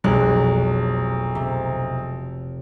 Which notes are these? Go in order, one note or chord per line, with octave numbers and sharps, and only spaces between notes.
F1 B1 G#3 F#6
C3